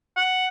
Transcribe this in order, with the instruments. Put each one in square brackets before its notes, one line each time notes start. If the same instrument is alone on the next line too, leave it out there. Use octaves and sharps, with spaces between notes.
[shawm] F#5